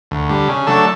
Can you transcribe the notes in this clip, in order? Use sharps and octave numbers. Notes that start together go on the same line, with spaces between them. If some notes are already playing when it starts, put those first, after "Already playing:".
D2
D3 G3
C#3
F#3 A3 D4 A4